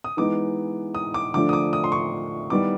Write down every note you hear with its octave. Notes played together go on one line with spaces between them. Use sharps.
D#6
E3 G#3 B3 D#4 D6
D#6
D6
D3 F3 A3 D4 D6
D#6
D6
D#6
C6
C#6
D#3 G3 B3 E4 D6